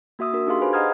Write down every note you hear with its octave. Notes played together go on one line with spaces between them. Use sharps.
A#3 F#4 E5 D#6 E6
D4 F#4 A#4
D4 D#4 G4 G#4 F5 C6
G#4 B4 C5 F5 G#5 B5
D#5 F#5 A#5 D#6 F6 G#6